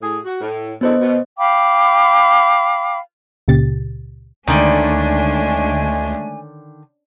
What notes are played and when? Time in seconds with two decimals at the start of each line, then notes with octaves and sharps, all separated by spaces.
0.01 A2 G#4
0.24 F#4
0.40 A2
0.81 F#2 D3 B3 E4 C5 D#5
1.00 B2
1.38 F5 G5 B5 D6
3.48 C#2 A#2 C#3 G4 A6
4.47 D2 D3 D#3 G#3 A3 C#4 D4 G#5